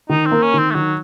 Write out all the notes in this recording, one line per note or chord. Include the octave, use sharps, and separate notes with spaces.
D#3 D#4
C4
A#3
C#4
D#3 C4
A3
D#3 F#3